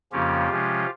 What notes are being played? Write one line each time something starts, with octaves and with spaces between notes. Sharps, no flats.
F2 C#3 F3 A#3 C#4 F4 G4
C3 F3 G#3 C#4